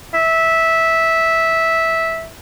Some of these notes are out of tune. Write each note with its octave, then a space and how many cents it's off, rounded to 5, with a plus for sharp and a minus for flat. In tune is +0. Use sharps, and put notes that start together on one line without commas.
E5 -10